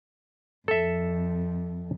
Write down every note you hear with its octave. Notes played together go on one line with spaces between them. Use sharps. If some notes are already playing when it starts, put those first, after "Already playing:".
F2 A4 E5